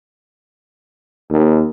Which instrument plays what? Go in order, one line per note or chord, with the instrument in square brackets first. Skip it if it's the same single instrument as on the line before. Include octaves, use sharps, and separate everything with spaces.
[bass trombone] D#2